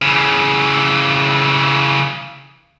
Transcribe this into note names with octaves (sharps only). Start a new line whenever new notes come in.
C#3 E3